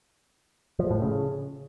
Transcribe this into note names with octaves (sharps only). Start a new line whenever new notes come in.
F3
A2
C#3